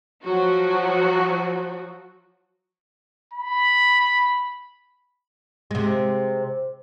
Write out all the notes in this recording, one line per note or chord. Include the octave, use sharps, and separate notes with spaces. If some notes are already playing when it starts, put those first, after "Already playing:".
F3 F#3 F#4
B5
C3 G#3